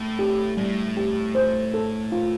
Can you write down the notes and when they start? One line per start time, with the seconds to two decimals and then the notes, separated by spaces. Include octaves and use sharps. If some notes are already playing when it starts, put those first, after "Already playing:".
Already playing: A2
0.19 G4
0.57 A2 G3
0.97 G4
1.35 C5
1.74 A4
2.12 F4